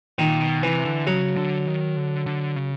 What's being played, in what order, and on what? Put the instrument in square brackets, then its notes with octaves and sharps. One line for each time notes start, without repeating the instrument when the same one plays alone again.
[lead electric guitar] A#2 [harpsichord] D#3
[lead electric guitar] B2
[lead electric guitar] C3 [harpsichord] E3
[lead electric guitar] D3
[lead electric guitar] C#3 [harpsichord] F#3
[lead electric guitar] D3
D#3
D3
D3
C#3